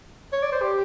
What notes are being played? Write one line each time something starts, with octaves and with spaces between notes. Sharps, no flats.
C#5
D5
C5
G4